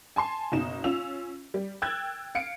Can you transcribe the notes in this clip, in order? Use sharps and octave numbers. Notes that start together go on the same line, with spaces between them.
G#5 A5 C6 C7
F#1 B2 D#4 E7
C#4 F4 E6 F7
G3
G5 E6 F#6 G#6 A6
F5 C#7 D7